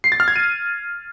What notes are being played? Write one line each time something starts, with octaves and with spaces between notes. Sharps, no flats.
C7
A6
F6
G#6
D#7